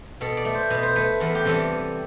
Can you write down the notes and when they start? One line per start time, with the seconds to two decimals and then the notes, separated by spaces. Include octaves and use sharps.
0.21 B2 A4
0.37 D5
0.45 A3
0.55 C5
0.70 B2 B4
0.83 C5
0.96 A3 B4
1.20 E2 A4
1.35 G4
1.45 C3 E3 G3 A4